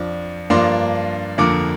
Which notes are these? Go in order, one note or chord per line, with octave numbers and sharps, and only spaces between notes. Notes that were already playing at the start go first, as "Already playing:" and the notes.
Already playing: F2 F3 D4
G2 F3 A#3 D4 C6
F2 D3 F3 A#3 D6